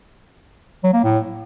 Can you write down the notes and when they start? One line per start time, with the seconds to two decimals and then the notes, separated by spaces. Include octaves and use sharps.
0.83 F#3
0.94 A#3
1.04 A2